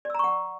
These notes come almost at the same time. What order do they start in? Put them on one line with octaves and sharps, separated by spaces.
D5 E6 A#5 C#6 F#5